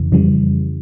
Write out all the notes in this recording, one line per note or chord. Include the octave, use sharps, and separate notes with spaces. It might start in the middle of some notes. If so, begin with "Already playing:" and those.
Already playing: F2 C#3 E3
F2 C#3 E3 G3